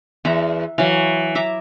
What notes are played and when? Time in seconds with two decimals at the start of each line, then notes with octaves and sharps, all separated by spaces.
0.25 E2 E5 F#5 A#5
0.78 E3 F#3 F5
1.35 E5 A#5 D6